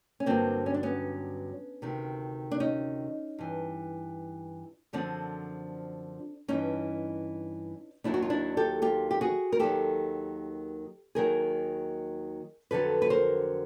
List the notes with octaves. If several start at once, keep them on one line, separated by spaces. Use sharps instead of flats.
C#4
G2 D3 F#3 A#3 C4
C#4
D4
B3 C#4
D2 C3 D#3
D4
C#4 D#4
G2 E3
F#2 D3 F3 C4 D4
G2 E3 C#4 D#4
D#2 D#3 F#3 D4 E4
F#4
F4
D4 E4
G4 A4
F4 G4
G4
F#4 G#4
A#4
D#2 D#3 F#3 G4 A4
D#2 D#3 F#3 G#4 A#4
F2 D3 F#3 A4 B4
B4
A#4 C5